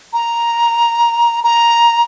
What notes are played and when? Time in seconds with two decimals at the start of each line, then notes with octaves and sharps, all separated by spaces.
0.13 A#5
1.44 A#5